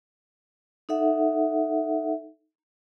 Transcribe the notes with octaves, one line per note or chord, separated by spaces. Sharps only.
D#4 A4 E5 F#5